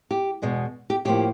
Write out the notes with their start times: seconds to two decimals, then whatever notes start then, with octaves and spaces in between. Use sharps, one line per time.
0.11 G4
0.42 E2 B2 G#3 B3
0.90 G4
1.05 A2 F3 A#3 G4